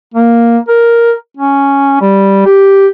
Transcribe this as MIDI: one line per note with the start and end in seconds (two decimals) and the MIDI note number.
0.14 0.58 58
0.68 1.13 70
1.37 2.00 61
2.01 2.41 55
2.45 2.86 67